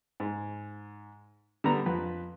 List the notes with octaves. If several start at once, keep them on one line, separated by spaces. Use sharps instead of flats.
G#2
D3 G3 B3 A#5
F2 B4